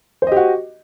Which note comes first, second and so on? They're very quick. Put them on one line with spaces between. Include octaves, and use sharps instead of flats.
C5 D#5 G4 F#4